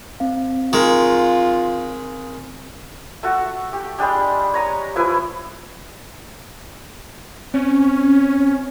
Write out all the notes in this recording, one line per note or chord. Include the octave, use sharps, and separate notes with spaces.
C4 F5
D#3 G#3 F4
A3 F#4
G4
G3 G#3 D4 G4
C#5 A#5 D#6
F3 E4 B4 G#5
C4 C#4